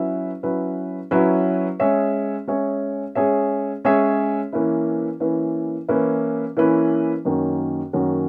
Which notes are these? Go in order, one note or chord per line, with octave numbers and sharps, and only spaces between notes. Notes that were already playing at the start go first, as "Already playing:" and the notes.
Already playing: F#3 C#4 E4 B4 E5
F#3 C#4 E4 B4 E5
F#3 C#4 E4 B4 E5
G#3 C#4 G#4 C#5 E5
G#3 C#4 G#4 C#5 E5
G#3 C#4 G#4 C#5 E5
G#3 C#4 G#4 C#5 E5
E3 A#3 C#4 E4 B4
E3 A#3 C#4 E4 B4
E3 A#3 C#4 E4 B4
E3 A#3 C#4 E4 B4
F#2 D#3 A#3 C#4 F#4
F#2 D#3 A#3 C#4 F#4